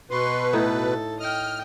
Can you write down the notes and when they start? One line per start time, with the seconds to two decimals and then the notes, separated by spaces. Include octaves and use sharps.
0.11 B2 B4 C6 C#6
0.53 A2 D#4 A4
1.20 D#5 G5 F6